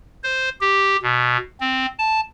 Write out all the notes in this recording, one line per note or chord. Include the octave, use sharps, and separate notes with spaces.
C5
G4
B2
C4
A5